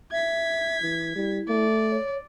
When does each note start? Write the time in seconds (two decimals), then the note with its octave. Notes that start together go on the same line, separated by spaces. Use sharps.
0.12 E5 G#6 B6
0.82 E3
1.16 G3 E4
1.48 A3 D5
1.91 C#5